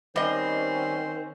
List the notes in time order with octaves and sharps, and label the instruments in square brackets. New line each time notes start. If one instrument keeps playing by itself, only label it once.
[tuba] D#3 [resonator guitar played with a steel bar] G3 D#5 [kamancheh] C4 C#4 [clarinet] C5